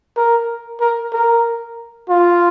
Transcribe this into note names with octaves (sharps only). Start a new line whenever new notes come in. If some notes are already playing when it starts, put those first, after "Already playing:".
A#4
A#4
A#4
F4